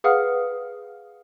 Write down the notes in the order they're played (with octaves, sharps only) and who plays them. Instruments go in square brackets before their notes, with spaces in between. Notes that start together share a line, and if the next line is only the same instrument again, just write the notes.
[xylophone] G#4 B4 F5 F#5 D#6 F6